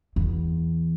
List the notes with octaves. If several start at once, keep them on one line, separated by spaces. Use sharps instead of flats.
E2